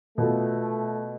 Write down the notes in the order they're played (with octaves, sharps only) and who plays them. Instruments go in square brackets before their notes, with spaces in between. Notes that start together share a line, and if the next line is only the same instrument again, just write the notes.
[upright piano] B2 B3 F4 A4 [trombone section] A3